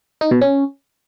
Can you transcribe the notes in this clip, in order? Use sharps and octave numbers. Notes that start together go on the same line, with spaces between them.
D#4
B2
C#4